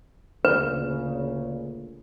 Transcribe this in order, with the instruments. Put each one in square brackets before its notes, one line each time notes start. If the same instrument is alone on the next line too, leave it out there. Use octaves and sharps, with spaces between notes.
[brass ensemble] D2 A#2 C#3 [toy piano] B4